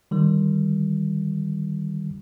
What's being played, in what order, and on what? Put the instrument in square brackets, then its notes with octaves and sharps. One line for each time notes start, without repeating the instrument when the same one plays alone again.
[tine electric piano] D3 D#3 G3